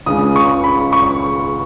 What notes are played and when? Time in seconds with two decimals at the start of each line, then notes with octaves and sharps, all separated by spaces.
0.06 C#2 C#3 G#3 D#6
0.36 C#6
0.64 B5
0.93 C#6